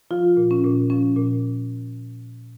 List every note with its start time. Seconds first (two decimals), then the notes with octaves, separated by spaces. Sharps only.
0.11 F3 F4
0.37 A#2
0.51 C#4
0.64 A#2
0.90 F3 C#4
1.16 A#2